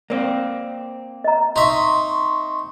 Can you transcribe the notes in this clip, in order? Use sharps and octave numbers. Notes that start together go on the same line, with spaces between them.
A#3 C4 D5
D#5 A#5
D#4 E5 C6 C#6